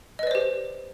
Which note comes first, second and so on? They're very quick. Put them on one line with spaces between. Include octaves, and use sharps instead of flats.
D#5 B4 D5 C5 G4